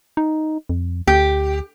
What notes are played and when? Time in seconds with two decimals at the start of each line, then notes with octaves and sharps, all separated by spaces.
0.17 D#4
0.69 F2
1.07 D2 G4